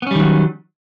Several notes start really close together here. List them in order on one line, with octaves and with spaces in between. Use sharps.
B3 C#4 G3 D#3 F#3